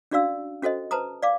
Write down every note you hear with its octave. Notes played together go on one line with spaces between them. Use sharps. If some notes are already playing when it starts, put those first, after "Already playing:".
C#4 D4 F#4 D5 F5 E6
C#4 F#4 A4 C5 D#5
B4 C5 A5 A#5 D#6
D5 F5 D6